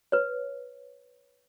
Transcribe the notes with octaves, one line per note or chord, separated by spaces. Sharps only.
B4 C#5